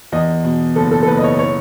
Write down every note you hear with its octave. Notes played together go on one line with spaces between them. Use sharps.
E2 D#5
B2
F#1 A4
A4
A4
F#1 B4
D#5
C#5
C#5